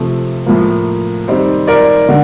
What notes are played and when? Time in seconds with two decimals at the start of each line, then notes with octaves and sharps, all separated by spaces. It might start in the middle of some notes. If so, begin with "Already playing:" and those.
Already playing: C3 F3 A3 C4
0.46 A2 F3 A#3
1.28 D#3 G3 C4
1.67 A#4 D5
2.09 D3